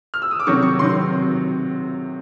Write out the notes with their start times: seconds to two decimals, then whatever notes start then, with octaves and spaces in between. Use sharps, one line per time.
0.14 F6
0.22 E6
0.31 D#6
0.40 D6
0.47 C3 D#3 F#3 C#6
0.63 C#6
0.78 C3 D#3 F#3 C6
1.10 C3